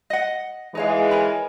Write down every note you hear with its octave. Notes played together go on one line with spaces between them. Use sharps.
D#5 F#5
E3 G#3 D#4 C#5 F5
A#4 C#5 B5